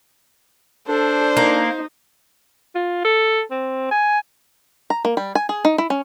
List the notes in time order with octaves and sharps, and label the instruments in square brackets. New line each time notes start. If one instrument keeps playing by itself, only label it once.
[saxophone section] D4 [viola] A4 [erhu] C5
[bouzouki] A#3 [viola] D#4
[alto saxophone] F4
A4
C4
G#5
[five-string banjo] A#5
A#3
G3
G#5
G#4
D#4
E4
C#4